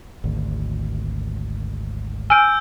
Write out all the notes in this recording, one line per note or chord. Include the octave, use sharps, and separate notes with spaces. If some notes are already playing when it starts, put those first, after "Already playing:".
G#1 D2
G#5 E6 F6 G6 D7